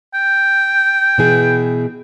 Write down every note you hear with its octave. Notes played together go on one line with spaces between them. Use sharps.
G5
B2 E3 G#4